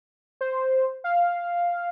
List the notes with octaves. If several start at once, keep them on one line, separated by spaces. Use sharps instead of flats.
C5
F5